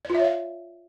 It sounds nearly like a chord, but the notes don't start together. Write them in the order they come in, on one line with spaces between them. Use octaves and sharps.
D5 F4 E5 C#5 F5